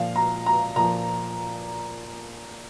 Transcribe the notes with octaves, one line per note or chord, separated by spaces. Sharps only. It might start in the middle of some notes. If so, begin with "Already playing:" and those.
Already playing: A#2 F3 F5
A#5
A#5
A#2 F3 A#5